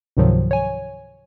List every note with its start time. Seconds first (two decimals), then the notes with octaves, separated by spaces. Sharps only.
0.17 C#2 G#2 C3 D#3 F3 F#3
0.51 C#5 G#5